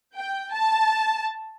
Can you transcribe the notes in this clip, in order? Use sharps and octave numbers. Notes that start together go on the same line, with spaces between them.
G5
A5